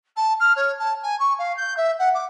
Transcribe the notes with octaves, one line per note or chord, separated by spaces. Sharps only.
A5
F6
C#5
A5
G#5
C#6
F5
G6
E5
F#5
D6